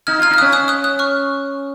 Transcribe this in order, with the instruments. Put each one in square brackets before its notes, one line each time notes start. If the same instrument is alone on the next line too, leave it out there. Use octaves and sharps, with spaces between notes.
[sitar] D#4 [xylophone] F6 G#6
[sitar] F4 [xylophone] F6 G#6
[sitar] D#4 [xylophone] F6
[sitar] C#4 [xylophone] D#6 F#6
[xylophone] D#6 F#6
D#6 F#6
D#6 F#6
C#6 F6